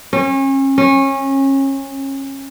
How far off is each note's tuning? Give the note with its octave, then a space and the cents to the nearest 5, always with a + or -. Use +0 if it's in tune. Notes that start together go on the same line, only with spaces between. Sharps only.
C#4 -35
C#4 -25